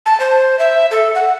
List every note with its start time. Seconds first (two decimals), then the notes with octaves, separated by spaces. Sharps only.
0.06 A5
0.20 C5
0.59 E5
0.91 A4
1.15 F#5